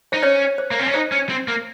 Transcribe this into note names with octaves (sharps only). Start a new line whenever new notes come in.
D#4 C5
C#4 C#5
C5
A#3
C4
C#4
D#4 C5
C#4
C4
A#3